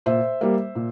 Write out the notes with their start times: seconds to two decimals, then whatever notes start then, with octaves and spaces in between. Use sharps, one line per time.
0.06 A#2 C5 E5
0.41 G3 A#3
0.75 A#2